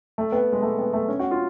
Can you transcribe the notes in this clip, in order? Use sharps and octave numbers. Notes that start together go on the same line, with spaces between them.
A3
B3
G#3
A3
B3
A3
C#4
F#4
F4